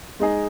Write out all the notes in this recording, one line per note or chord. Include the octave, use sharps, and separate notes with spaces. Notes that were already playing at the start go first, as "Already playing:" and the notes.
G#3 D#4 G#4